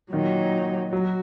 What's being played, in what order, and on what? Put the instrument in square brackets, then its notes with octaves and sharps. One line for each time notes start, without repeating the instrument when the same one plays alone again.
[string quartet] A#2 F#3 D#4 [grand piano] D#3
[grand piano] F#3 [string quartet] F#4